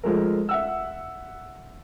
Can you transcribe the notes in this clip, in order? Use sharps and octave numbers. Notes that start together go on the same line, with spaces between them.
F3 G#3 A3 A#4
E5 F#5 E6